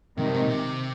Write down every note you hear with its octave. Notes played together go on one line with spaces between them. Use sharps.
G#2 C3 D#3
G2
G#2
A#2
C3